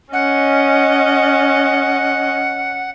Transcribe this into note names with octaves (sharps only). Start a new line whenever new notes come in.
C#4 D#5 F#5